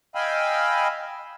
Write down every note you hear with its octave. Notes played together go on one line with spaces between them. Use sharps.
D#5 F5 G5 G#5 B5 E6